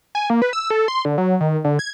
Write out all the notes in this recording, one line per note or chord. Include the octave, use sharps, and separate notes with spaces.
G#5
A#3
B4
E6
A4
C6
D3
F#3
D#3
D3
G#6